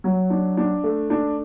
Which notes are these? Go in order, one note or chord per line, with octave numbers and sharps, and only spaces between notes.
F#3
D4
D4
A3
D4